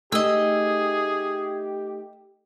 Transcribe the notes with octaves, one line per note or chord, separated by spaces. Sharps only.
A3 D#4 G4 G#4 D#5 E6